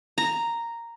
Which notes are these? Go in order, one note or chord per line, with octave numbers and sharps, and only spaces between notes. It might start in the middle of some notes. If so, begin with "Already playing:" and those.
A#5